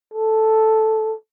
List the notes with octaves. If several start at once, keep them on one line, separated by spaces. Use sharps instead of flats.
A4